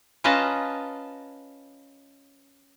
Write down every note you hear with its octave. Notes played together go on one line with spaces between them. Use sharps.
C#4 F4 B4 D#5 A5 A#5